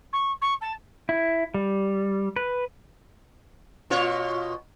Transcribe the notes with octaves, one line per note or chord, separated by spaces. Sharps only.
C#6
C#6
A5
E4
G3
B4
B2 F4 C#5